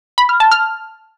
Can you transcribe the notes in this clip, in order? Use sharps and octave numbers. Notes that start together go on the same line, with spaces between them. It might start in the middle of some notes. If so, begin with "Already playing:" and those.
B5
F6
A5
F6